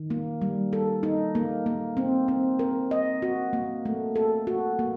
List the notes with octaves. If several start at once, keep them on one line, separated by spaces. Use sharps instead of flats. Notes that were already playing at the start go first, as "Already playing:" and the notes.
Already playing: D#3
A#3
G3
A4
D#4
A#3
A#3
C4
C4
A#4
D#5
F#4
A#3
A3
A4
F#4
A#3